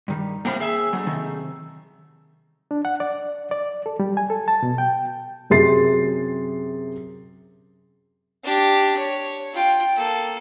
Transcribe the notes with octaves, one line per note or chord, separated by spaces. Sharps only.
G2 D#3 G3
G#2 C3 A#3 G5 B5
G#4 E5
F#2 F#3 A3
C3 D#3
D4
F#5
D5
D5
A4
G3
G#5
A4
A5
B2
G5
F#2 C3 G#4 C6 A6 C7
D4 G4
C#5
F4 G5
A#3 A4